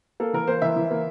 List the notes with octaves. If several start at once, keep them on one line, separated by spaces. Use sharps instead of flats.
A#3 A4
E3 A#4
A#3 C5
E3 E5
E3
A#3